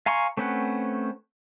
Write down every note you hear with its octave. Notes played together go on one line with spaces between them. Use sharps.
F5 G#5 A#5 C6 C#6
A3 C4 C#4 B4 F#5